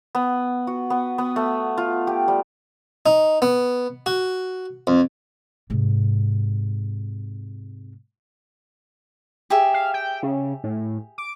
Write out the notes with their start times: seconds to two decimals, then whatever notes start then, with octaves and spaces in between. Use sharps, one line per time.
0.15 B3
0.67 F#4
0.90 B3
1.18 B3
1.36 A3
1.78 F4
2.07 G4
2.28 G3
3.06 D#4
3.42 B3
4.06 F#4
4.87 F2
5.70 G#2 C3
9.50 G4 G#4 E5
9.74 F5
9.94 G5
10.23 C#3
10.64 A2
11.18 D6